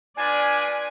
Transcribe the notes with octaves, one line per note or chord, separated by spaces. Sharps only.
D4 F4 B4 D5 G#5